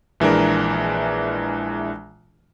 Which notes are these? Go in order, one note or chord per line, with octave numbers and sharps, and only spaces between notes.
A#1 E3 G#3 D4 A#4